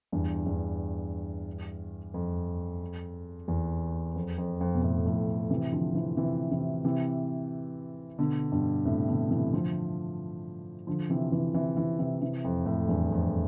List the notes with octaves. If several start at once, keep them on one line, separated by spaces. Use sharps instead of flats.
E2 G2
E2 G2
F2
E2
F2
F2
F2
B2
F2 A2
F2 A2
C3 E3
D3 F3
C3 E3
C3 E3
C3 E3
C3 E3
B2 D3
G2 B2
A2 C3
B2 D3
C3 E3
D3 F3
D3 F3
C3 E3
C3 E3
C3 E3
C3 E3
C3 E3
C3 E3
F2
F2 A2
E2 G2
F2